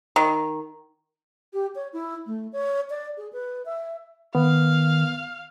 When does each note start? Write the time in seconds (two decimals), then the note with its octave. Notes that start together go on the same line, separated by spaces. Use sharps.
0.16 D#3
1.53 G4
1.75 C#5
1.93 E4
2.26 A3
2.53 C#5
2.90 D5
3.17 G#4
3.33 B4
3.66 E5
4.35 D#3 B3 F5